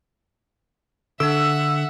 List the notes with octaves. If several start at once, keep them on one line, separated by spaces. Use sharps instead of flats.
D3 D4 A4 E5 F#5 E6